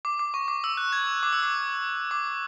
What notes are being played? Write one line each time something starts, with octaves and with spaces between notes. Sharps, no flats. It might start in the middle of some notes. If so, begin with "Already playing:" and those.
D6
D6
C#6
D6
E6
F#6
G#6
D6
E6
D6
D6